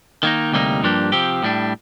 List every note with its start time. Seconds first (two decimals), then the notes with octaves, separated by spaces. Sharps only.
0.23 D#3 A#3 D#4
0.53 D2 C3 G3 A#3 D#4
0.82 G2 F3 A#3 D4 G4
1.12 C3 F3 C4 G4
1.43 A2 G3 D4